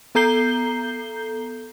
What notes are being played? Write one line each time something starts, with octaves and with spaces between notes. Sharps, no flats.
B3 A4 A#5 G6 C7 G7